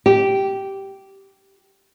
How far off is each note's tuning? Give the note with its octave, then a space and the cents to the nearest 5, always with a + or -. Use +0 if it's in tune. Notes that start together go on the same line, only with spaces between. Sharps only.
G4 -10